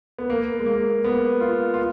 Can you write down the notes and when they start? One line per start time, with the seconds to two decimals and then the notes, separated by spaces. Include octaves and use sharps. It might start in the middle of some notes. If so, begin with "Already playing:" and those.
0.18 B3
0.30 A#3
0.59 G#3
0.66 A#3
1.04 B3
1.41 F4
1.74 F4